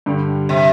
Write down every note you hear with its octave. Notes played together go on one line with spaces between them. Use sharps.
G2 D3 G3
C3